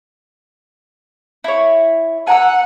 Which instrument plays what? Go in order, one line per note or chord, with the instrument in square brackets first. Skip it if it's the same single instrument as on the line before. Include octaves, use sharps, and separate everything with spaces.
[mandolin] E4 C#5
[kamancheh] F#5 [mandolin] G#5 A#5 E6